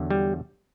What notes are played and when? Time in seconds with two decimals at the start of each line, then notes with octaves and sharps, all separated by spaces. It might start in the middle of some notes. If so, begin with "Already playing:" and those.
Already playing: E2 D3 F#3
0.10 G3